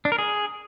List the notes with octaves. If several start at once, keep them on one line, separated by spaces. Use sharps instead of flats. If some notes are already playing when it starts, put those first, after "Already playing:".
D4
A#4
G#4